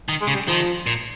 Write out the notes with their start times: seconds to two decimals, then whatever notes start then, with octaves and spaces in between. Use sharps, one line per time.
0.09 D#3
0.21 G#3
0.27 C#3
0.34 G3
0.48 D#3 F3
0.86 A#2